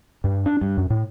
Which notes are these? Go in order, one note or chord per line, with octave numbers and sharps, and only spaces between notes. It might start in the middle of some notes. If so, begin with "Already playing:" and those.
G2
D4
G2
F#2
A2